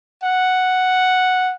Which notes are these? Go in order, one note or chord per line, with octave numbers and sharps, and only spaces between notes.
F#5